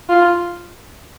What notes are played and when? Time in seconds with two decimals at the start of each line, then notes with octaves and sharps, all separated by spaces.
0.09 F4